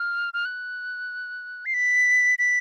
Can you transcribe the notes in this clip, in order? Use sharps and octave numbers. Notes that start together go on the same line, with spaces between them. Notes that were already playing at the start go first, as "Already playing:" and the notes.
Already playing: F6
F6
F#6
C7
B6
B6